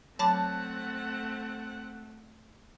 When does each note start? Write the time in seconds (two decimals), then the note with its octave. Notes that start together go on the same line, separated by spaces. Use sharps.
0.19 F#3 A3 C4 F#5 A5 B5 D6